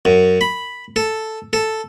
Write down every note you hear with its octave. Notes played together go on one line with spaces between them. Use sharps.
F#2
B5
A4
A4